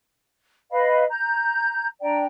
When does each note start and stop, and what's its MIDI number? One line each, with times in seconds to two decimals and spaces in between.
0.71 1.03 71
0.71 1.03 75
0.71 1.03 77
0.71 1.03 83
1.09 1.86 82
1.09 1.86 91
2.01 2.25 62
2.01 2.25 74
2.01 2.25 79
2.01 2.25 82